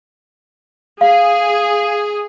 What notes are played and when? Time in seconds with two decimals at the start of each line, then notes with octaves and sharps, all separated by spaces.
1.01 G#4 F5